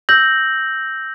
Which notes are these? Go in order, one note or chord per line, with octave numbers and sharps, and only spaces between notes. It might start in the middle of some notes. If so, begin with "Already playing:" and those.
E6 G6 A#6 F#7